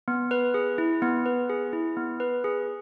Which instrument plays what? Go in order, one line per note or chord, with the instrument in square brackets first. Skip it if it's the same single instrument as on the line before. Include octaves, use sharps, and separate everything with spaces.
[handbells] B3
B4
G#4
E4
B3
B4
G#4
E4
B3
B4
G#4